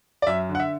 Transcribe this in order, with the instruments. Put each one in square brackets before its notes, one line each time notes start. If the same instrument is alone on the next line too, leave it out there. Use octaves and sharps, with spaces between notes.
[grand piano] D5
F#2 E5
D3
F#5
E5